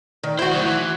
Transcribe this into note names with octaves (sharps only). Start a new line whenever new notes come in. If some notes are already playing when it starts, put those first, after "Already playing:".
D#3
E4 F#4 C5
D#3 F#3
E3